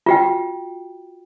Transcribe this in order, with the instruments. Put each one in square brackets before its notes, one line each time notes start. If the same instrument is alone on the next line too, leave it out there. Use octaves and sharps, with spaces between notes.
[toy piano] F4 F#4 G5